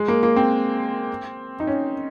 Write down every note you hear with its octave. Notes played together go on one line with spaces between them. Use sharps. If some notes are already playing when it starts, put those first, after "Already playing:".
Already playing: G#3
A#3
A#3
C4
D#4
C#4